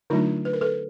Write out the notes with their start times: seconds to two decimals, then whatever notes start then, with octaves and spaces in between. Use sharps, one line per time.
0.10 D3 F#3 A3 D4 D#4 F4
0.45 B4
0.53 A#4
0.61 A4 B4